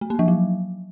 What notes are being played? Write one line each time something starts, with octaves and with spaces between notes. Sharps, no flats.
A3
A#3
F3
F#3